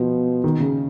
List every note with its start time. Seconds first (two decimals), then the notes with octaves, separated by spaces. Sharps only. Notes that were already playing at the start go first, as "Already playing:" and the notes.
Already playing: B2 F3
0.44 D#3
0.60 C#3